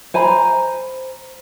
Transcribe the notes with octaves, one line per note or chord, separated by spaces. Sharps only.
C5 G#5 A#5 B5